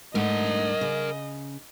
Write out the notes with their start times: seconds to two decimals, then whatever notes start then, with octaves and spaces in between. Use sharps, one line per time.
0.15 G#2 A3 D4 A#4 D#5 F#5
0.81 C#3